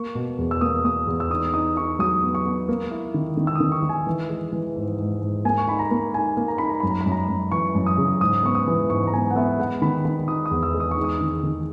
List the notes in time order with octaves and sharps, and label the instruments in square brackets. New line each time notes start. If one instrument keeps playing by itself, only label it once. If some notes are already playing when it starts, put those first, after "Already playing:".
Already playing: [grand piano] A#3 C#6
B2
E2
E6
A#3 D#6
A#3 D#6
E2
E6
D#4 D#6
D#4 D#6
D#4 C#6
F#3 D#6
B3
C#6
B3
A#3
E4
D#3
D#3
E6
D#3 D#6
C#6
D#3
G#5
E3
G#3
E3
G#2
G#2
G#2
A#3 G#5
C#6
D#4 B5
A#5
A#3
D#4 G#5
A#3
A#5
D#4 B5
A#5
F#2 B5
A#5
F#2 B5
A#5
F#2
E3 C#6
F#2
D#6
C#3
G#2 D#6
B3 C#6
D#6
E3
G#2 C#6
A#5
B3 G#5
F#5
B3 E5
G#3 F#5
D#3 B5
D#3 B5
D#4 D#6
D#6
E2
E6
G#3
D#6
C#6
D#4
D#6
D#3
D#3